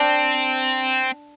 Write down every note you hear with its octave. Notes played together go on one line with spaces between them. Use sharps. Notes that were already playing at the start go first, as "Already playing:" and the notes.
Already playing: C4 D4